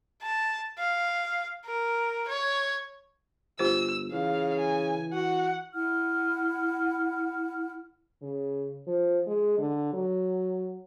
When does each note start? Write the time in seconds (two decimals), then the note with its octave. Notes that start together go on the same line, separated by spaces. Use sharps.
0.23 A5
0.79 F5
1.66 A#4
2.28 C#5
3.59 G1 F4 G4 C5 E6
4.12 C#3 E3 F5
4.60 G#5
5.13 F#4 F#5
5.74 E4 F#5 F6
8.22 C#3
8.87 F3
9.27 G#3
9.58 D3
9.93 F#3